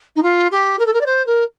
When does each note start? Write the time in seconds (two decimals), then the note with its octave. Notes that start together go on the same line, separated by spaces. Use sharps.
0.16 D#4
0.22 F4
0.51 G4
0.79 A#4
0.86 A4
0.93 A#4
1.01 D5
1.06 C5
1.26 A#4